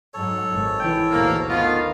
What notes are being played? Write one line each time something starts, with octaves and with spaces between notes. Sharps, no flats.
G#2 F#3 A4 C#5
G#1
E3 G5
D2 G#2 B2 A#3
D#3 A3 B3 F4 D#5 F5